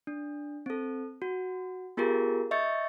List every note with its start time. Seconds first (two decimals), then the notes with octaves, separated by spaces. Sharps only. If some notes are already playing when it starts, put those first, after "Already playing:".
0.07 D4
0.66 C4 A4
1.22 F#4
1.97 B3 F4 G4 G#4 A#4
2.51 D#5 E5 C#6 G6 A6 C#7